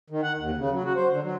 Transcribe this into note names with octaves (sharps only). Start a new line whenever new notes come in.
D#3
F#5
D#2
C#3
F#3
F#4
C5
D3
F#3